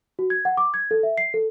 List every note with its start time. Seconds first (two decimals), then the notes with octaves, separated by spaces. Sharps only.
0.19 F#4
0.30 G#6
0.45 F#5
0.57 D6
0.74 G#6
0.91 A4
1.03 E5
1.18 C7
1.34 A4